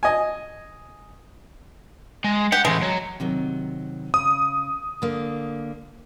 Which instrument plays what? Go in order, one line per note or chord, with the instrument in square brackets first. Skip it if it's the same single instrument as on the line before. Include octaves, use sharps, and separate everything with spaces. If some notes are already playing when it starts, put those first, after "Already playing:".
[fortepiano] D#5 G#5
[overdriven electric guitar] G#3
[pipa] G4 [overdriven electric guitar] F#5
[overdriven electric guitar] A2 E3 [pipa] G#3
[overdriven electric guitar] F#3
[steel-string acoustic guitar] C3 D#3 F#3
[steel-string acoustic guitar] C#3 [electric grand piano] D#6
[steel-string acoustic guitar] D3 A#3